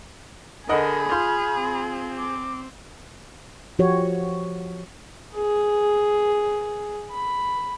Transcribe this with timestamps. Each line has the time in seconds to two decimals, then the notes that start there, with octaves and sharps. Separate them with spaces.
0.69 D3 G#4 A#4 D#5 F#5 B5
1.11 F4 C6 F6 G6
1.59 C4
2.17 D6
3.79 F3 F#4 G4 C#5
5.35 G#4
7.11 B5